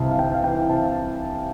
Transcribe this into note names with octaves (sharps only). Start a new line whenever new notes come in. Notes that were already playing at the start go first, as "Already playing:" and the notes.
Already playing: C2 C3 E3 F5 A5
F5
C2 G5
F5
E3 G5
C3 A5